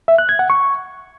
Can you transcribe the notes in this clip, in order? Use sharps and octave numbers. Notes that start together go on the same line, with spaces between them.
E5
F#6
G#6
F#5
C#6